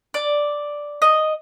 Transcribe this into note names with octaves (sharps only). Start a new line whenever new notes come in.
D5
D#5